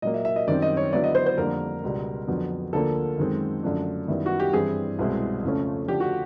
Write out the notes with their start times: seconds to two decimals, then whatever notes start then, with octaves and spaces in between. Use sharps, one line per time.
0.02 A#2 F#3 A#3 D#5
0.14 E5
0.25 E5
0.36 D#5
0.47 F#2 D#3 G3 C4 D5
0.62 D#5
0.77 C#5
0.92 D3 F#3 B3 E4 D5
1.04 D#5
1.15 C5
1.26 C5
1.38 F2 D3 G3 A#3 A#4
1.83 C#2 B2 G3
2.27 F2 D3 F#3 B3
2.73 D2 D3 F3 A#3 A4
3.18 F#2 D#3 G#3 C4
3.63 F#2 D3 F3 A3 D4
4.08 F#2 D#3 G3 B3 E4
4.26 F#4
4.40 G4
4.53 G2 E3 G3 C4 E4 G#4
4.99 C2 B2 G#3 C4 E4
5.43 F2 C#3 F3 A3 C#4
5.88 D3 F3 A3 G4
6.00 F#4